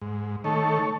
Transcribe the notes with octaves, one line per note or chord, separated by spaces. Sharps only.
G#2
D#3 A3 A4 C#5